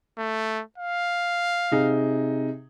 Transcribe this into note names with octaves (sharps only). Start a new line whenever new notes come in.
A3
F5
C3 D#4 G#4